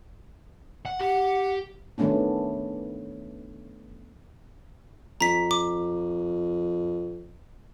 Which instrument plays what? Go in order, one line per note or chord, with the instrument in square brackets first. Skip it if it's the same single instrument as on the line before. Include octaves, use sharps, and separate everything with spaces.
[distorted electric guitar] F#5
[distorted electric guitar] G4 [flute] F#5
[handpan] D#3 F#3 A3 B3 C#4 D4
[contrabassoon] F2 [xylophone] A#5 B6
[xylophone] D6